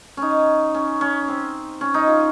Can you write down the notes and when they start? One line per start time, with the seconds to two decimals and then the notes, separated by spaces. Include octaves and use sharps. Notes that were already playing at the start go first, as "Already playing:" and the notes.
0.17 C#4 D#4
0.74 C#4
1.01 C#4
1.28 C4
1.81 C#4
1.94 D#4
2.07 F4